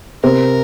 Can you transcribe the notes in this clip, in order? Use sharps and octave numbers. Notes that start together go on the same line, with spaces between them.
C3 C4 A#4